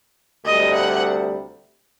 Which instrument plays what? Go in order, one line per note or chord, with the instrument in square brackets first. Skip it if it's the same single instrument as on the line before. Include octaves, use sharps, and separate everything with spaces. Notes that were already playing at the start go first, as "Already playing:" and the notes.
[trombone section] D2 C3 G3 [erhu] D#5
[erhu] F#5